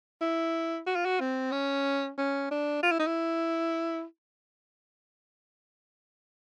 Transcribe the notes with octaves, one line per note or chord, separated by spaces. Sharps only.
E4
F#4
F4
F#4
C4
C#4
C#4
D4
F4
E4
D#4
E4